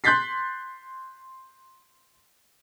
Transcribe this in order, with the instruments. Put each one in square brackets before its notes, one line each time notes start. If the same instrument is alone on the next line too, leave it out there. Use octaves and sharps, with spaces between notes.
[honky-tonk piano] C6 F#6 G6 A6 B6 C7